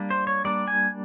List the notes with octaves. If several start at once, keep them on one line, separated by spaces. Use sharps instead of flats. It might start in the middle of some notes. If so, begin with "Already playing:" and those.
Already playing: G3 A#3 D4
C5
C#5
G3 A#3 D4 D5
G#5